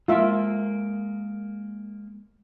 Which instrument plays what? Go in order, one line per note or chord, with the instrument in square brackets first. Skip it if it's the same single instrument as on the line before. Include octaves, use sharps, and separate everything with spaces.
[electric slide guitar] G#3 A#3 A#4 [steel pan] F4 E5